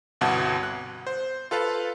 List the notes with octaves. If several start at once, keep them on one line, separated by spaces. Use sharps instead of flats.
G1 C2 B2 F#5 A5
F#6
C5
F4 A4 B4 F5